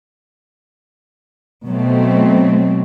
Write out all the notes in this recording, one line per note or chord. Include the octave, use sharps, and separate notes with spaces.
B2 F#3 A3 C4